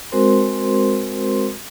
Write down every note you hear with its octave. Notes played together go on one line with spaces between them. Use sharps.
G#3 C4 F#4 A#4 C5 C6